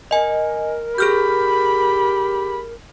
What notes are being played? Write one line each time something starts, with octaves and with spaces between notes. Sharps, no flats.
A#4 D#5 G#5
G4 G#4 B5 F6 G6